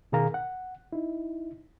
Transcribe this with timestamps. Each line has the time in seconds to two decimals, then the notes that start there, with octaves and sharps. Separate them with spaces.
0.12 B2 D#3 G#4 A#4 F5 A#5
0.34 F#5
0.93 D#4 E4